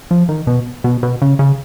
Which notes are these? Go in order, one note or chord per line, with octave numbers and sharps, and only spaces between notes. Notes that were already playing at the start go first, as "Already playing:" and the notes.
F3
D#3
B2
B2
B2
C#3
C#3